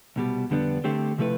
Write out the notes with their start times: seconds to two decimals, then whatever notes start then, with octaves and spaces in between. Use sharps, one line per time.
0.16 C2 B2 G3
0.50 F2 D3 G3 B3 D4
0.84 D3 A3 C4 G4 C5
1.18 C3 F3 A3 E4 B4